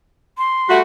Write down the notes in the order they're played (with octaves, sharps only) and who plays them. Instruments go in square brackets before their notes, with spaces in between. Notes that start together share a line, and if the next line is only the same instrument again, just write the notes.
[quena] C6
[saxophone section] G3 A3 F#4